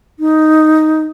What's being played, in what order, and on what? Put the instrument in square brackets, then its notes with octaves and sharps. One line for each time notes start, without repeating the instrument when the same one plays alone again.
[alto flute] D#4